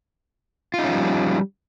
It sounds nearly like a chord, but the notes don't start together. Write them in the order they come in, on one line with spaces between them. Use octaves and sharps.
F4 D#4 C#4 F3 G3